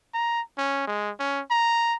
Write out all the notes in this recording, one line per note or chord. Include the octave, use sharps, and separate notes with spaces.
A#5
C#4
G#3
C#4
A#5